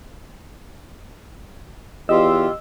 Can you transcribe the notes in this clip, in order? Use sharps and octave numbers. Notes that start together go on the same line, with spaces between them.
E2 F4 G4 D#5 E6